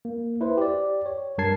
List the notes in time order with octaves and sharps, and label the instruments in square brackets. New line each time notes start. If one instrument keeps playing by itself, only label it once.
[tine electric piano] A#3
E4 B4 C5
G4 D5
C#5
G2 G3 A#4 A5 G#6 C7